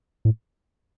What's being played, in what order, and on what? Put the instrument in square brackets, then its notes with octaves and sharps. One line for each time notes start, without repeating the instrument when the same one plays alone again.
[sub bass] A2